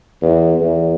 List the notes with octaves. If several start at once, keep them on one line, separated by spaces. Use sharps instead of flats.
E2
E2